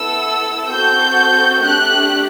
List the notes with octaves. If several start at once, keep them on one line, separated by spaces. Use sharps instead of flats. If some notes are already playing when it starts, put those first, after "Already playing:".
Already playing: B3 E4 A4 E6
C4 F#4 A4 G6
A3 D4 G4 F#6